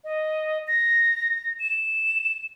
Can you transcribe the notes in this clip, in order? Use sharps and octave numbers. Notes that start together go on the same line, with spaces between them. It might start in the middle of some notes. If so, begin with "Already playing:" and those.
D#5
A#6
E7